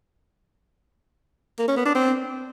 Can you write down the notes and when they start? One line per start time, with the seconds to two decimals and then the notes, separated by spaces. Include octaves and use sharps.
1.59 A#3
1.68 C#4
1.77 B3
1.86 D4
1.95 C4